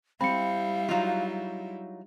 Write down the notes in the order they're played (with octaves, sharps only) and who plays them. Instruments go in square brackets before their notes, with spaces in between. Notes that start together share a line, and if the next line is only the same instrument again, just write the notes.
[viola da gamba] G3 E4 [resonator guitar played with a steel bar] C4 [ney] F5 [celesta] B5 C#7
[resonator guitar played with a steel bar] F#3 D#4 F4